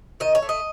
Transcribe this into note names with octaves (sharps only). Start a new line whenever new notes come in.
D#3 D#5
C#5
A3
D#5